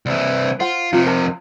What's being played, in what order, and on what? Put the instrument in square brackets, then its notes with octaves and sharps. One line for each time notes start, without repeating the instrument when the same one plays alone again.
[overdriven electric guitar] C2 E3
[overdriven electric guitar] F4 [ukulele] C5 F#5
[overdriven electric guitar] F2 C3 [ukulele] F4
[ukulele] A#4 A5